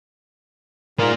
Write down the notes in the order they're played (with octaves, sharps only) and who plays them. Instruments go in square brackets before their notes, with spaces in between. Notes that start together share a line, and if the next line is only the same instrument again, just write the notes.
[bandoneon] G#2 F4 A#4 [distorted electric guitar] A#3 D5